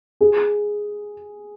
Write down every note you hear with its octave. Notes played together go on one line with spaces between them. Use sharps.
G#4